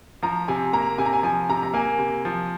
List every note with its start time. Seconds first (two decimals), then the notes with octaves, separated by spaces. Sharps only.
0.22 F3 A#5
0.48 C3 G#5
0.73 A#3 A#5
0.98 C3 G#5
1.06 A#5
1.13 G#5
1.23 F3 G#5
1.49 C3 A#5
1.63 A#5
1.73 A#3 G#5
1.99 C3
2.25 F3